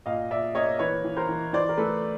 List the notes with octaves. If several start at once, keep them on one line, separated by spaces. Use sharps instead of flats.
A#2 D#5 F5
A#2 D5 E5
A#3 C#5 D#5
E3 B4 C#5
E3
A#4 C5
E3
E3 C5 D5
A#4
A3 A4 B4